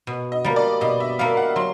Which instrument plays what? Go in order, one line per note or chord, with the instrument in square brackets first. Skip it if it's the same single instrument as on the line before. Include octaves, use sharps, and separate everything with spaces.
[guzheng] B2
[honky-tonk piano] D#5
[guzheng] G3 A#3
[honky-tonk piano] D5
[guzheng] B2 [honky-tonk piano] D#5
[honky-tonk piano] E5
[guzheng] G3 A#3 [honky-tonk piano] F5
[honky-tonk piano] F#5
[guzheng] F#3 [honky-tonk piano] C6